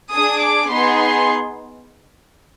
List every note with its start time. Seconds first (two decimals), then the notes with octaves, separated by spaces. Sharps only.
0.14 D4 G#4 D#6
0.43 D6
0.71 B3 D#4 G#4 C6
1.00 C6